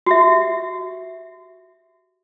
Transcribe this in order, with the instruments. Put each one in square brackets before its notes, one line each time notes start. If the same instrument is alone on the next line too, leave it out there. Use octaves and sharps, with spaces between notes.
[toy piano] F#4 G4 E5